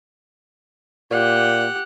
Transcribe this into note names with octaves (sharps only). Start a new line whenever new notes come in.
A#2 G4 F#5